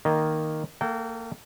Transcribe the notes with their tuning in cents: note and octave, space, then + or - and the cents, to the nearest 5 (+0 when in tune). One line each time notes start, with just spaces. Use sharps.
D#3 +0 A#3 +0 D#5 +0
A#3 -30 A4 +0 G5 -35